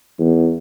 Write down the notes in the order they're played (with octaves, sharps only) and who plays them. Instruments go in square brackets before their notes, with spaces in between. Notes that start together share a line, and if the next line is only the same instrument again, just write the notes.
[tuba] E2